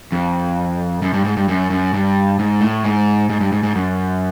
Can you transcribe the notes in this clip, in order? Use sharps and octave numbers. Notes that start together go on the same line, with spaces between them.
F2
F#2
G2
G#2
G2
F#2
F#2
G2
G#2
A2
G#2
G#2
G2
G#2
G#2
F#2